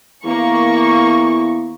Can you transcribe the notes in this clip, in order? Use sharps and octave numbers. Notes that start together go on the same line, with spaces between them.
E2 A#3 C#6